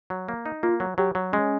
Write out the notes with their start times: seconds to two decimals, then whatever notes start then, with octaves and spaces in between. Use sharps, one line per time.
0.10 F#3
0.29 A#3
0.46 D#4
0.63 A#3 F4
0.80 F#3
0.98 F#3 G4
1.15 F#3
1.32 G#3 C#4